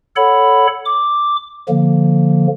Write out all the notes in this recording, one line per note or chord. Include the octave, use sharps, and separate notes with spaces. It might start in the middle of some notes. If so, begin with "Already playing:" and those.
A4 C#5 F#5 B5
D6
D3 F3 A#3